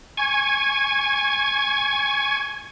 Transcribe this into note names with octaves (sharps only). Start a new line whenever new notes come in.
G#5 C#6 G#6